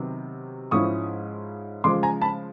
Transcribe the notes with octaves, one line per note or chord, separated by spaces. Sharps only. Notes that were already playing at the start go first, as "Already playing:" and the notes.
Already playing: C3 D#3 F#3 B3
G#2 F3 G#3 C#4 E4 C#6 D#6
C#3 F3 G#3 C6 D6
G#5 A#5
A5 B5